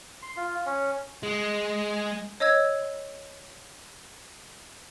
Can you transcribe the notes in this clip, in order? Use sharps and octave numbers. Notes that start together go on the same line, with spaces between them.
C6
F4
C#4
G#3
C#5 D#5 E6 G#6